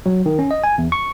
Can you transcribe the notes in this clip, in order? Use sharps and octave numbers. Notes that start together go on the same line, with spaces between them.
F#3
D#3
C#4
D#5
G#5
E2
C#6